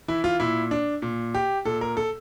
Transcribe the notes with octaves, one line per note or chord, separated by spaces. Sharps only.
E3 E4
F4
A#2 E4
D4
A#2
G4
A#2 A4
A#4
A4